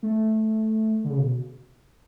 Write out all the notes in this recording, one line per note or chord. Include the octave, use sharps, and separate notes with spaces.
A3
D3
C#3
B2